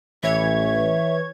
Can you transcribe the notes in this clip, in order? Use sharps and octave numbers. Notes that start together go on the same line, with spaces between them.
A1 E3 C#5 E5 G#6